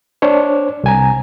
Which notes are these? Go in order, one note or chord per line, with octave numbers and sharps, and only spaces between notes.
D4 C5 C#5
C2 G#5 A#5